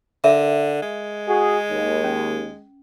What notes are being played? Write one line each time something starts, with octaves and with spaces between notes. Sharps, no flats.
D3 A#4 E5
G#3
F#4 G#4
D#2
C#4